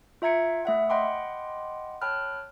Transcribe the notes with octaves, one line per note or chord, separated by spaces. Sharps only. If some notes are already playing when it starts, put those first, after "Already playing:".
F4 E5 A#5 G#6 C#7 D7
A3 E5 F#5
D#5 F#5 G5 B5 C6 D6
C#5 G5 A5 B5 F6 F#6